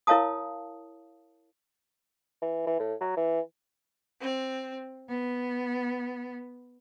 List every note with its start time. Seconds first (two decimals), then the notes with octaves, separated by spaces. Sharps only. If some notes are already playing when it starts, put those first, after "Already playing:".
0.07 E4 A#4 C#5 F5 A5 D#6
2.42 E3
2.67 E3
2.80 A2
3.01 F#3
3.17 E3
4.21 C4
5.08 B3